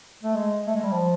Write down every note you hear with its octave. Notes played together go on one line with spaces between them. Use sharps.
A3
G#3
A3
G#3
G3
F3